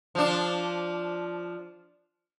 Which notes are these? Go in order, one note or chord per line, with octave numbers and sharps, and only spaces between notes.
F3 D4